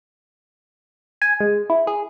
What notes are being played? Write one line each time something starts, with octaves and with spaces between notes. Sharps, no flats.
G#5
G#3
E4
G#4